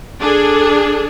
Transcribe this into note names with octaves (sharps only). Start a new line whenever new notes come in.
D4 G#4 A4